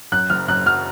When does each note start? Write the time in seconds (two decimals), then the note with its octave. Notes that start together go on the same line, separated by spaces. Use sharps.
0.12 F#2 F#6
0.30 F#1 F6
0.48 F#2 F#6
0.66 F#3 F6